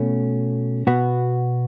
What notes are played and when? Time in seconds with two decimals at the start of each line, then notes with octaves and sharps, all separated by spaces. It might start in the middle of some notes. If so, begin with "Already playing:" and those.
Already playing: B2 A3 C#4
0.87 B2 B3 F#4